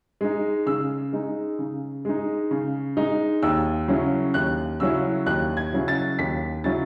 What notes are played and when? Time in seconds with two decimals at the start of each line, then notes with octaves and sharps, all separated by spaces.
0.21 G#3 D#4
0.66 C#3 E6
1.13 G#3 D#4
1.59 C#3
2.05 G#3 D#4
2.51 C#3
2.97 G#3 D#4
3.43 D#2 E6
3.88 C#3 F#3 C#4 E4
4.34 D#2 F#6
4.80 C#3 F#3 C#4 E4 E6
5.26 D#2 F#6
5.57 G#6
5.72 C#3 F#3 C#4 E4
5.88 A6
6.19 D#2 B6
6.64 C#3 F#3 C#4 E4 A6